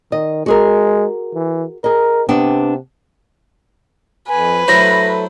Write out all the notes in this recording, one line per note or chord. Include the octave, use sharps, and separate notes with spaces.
D#3 D#5
G#3 F#4 G#4 A#4
E3
G#4 A#4 D#5
C3 B3 D4 G5
F2 B4 G#5
F#3 A3 E4 C5 C#5 A#6